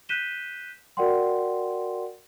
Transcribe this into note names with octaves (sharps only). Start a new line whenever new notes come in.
F#6 G6 B6 D#7 E7 G7
F#4 A#4 D5 F#5 G5 C6